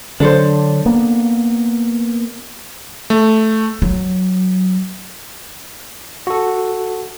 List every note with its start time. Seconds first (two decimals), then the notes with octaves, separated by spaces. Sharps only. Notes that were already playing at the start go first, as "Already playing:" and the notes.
0.20 D3 F#3 D4 A4 C5
0.86 A#3 B3
3.10 A3
3.82 F#3
6.27 F#4 A4